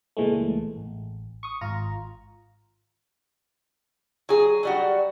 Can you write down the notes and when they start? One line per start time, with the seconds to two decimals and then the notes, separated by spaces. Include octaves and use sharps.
0.17 C#2 A#2 E3 G#3 A3
0.76 A1
1.43 C#6 D#6
1.61 G#1 F4 A#5
4.29 F#3 G#4
4.63 F#3 G3 F#4